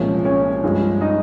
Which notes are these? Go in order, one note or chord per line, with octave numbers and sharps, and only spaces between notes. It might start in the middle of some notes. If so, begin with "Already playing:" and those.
Already playing: C2 A#2 F3 G#3 C#4 C#5
C#4 C#5
G2 F3 G#3
D#4 D#5